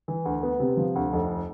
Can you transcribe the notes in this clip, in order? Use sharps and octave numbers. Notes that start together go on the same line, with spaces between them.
E3
D2
B3
C3
F3
D2
F1